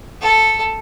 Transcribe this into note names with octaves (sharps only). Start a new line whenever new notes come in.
A4